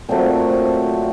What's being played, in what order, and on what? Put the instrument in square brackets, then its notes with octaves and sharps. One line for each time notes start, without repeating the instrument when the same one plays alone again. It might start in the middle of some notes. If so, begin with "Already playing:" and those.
[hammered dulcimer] A#2 F#3 A3 C4